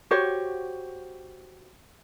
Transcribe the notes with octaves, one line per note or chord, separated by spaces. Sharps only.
F#4 G4 C5 C#5